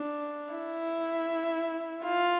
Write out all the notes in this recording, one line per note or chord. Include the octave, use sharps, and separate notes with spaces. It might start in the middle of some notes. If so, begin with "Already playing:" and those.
Already playing: D4
E4
F4